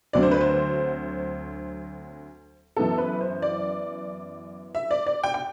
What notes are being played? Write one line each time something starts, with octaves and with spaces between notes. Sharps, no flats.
D2 D3 F#3 C4 D5
C5
B4
C5
F#2 E3 B3 A4
B4
C5
D5
E5
D5
D5
G5
G5